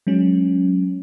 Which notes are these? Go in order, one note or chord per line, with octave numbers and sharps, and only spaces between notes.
F#3 G#3 C#4